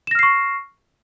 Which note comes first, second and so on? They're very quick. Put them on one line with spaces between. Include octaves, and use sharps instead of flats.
E7 A#6 F6 C7 C#6